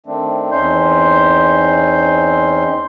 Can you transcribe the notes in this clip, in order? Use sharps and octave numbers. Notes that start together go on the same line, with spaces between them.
D#3 A3 C4 D4
E2 C4 C#4 D#4 C6 G6